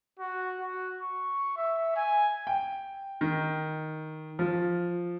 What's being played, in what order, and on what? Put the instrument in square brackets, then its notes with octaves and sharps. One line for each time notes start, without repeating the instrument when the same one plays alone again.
[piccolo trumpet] F#4
F#4
C#6
E5
G#5
[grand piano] G5
D#3
F3